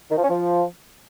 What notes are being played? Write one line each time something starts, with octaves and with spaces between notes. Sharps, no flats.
D#3
F3
C#4
F3